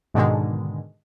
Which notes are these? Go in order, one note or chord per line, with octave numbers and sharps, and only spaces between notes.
G#2 B2 D3 D#3 G#3